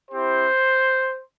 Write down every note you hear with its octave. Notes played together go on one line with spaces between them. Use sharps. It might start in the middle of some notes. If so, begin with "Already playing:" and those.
C4 E4 G4 C5